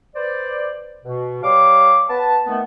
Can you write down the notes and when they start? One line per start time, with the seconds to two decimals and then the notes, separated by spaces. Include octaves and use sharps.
0.16 B4 C5 D5
1.05 B2
1.43 G3 C#5 F5 D6
2.10 B3 B4 A5
2.47 D#3 A3 B3